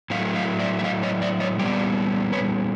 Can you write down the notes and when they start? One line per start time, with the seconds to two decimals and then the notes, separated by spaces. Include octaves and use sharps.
0.10 A2 F#3 A3 D#5 F5
0.35 D#5 F5
0.59 D5 E5
0.79 E5
0.84 D#5 F5
1.03 C#5 D#5
1.22 D5 E5
1.40 C#5 D#5
1.59 A#2 G3 B3 D5
2.33 B4 C#5